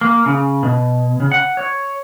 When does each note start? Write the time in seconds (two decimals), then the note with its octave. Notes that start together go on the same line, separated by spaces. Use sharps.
0.01 A#3
0.26 C#3
0.63 B2
1.20 C#3
1.32 F#5
1.57 C#5